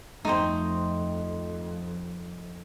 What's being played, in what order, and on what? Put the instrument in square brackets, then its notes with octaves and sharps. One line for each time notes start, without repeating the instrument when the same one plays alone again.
[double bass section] F2 [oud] A3 C4 [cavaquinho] D#4 C5